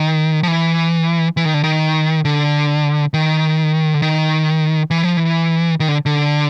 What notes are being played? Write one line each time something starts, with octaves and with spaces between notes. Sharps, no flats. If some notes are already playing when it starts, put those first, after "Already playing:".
Already playing: D#3
F3
E3
E3
D#3
D3
D#3
D3
D#3
D3
D#3
E3
F3
E3
D#3
D3
D3